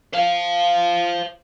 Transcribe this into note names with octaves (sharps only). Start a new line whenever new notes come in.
C5 F5